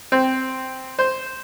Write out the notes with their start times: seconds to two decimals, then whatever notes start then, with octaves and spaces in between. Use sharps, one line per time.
0.12 C4
0.99 C5